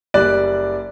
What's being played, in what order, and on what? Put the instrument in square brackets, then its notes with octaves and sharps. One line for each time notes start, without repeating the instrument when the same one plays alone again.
[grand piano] F#1 G3 D5 F#6